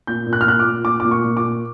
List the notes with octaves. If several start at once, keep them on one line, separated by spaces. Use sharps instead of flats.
A#2 G6
A#2
F#6
F6
A#2 F#6
D6
A#2
A#2 D6
A#2 D6
C#6
A#2
D6
A#2